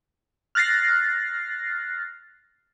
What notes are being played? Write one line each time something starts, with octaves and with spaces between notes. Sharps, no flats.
F6 F#6 A6 A#6 C7